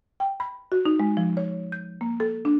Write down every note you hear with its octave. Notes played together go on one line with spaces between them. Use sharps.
G5
B5
F#4
D#4
G#3
F3
C#5
G6
A#3
A4
D4